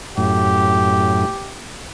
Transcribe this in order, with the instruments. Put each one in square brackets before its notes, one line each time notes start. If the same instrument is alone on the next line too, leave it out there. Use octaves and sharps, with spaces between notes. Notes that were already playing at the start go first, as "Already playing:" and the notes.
[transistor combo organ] F#2 A2 [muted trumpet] G4